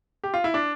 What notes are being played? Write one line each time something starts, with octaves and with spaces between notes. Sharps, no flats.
G4
F4
E4
D4